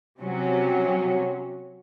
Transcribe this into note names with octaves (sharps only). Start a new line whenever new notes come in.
C3 F#3 C#4